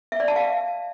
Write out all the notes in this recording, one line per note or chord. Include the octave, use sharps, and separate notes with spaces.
E5
D5
A5
F5
E5